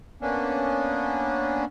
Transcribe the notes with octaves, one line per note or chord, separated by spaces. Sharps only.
A#3 B3 C#4 D4